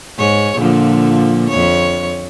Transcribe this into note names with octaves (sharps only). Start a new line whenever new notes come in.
G#2 G#4 C#5
A#2 D3 F3
F2 C#5